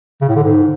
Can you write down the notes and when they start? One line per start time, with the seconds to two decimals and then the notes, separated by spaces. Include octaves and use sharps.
0.22 C#3
0.29 A2
0.36 D3
0.43 G#2